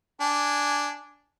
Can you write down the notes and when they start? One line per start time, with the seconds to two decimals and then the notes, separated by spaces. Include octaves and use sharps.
0.21 D4 G#5